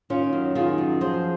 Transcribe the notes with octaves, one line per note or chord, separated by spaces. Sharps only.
D#3 C#4 F4
F#2
D#3 F4 G#4
F#2
F3 G#4 C5